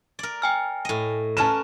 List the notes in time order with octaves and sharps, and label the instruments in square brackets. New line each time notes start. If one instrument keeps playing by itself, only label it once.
[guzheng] A#4 D5
[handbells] G5 G#5 F6
[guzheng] A2 D#5
[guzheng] C#4 A#4 B4 [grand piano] A5 E7